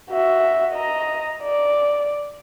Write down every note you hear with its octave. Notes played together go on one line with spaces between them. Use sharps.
F#4 E5
D#5 A#5
D5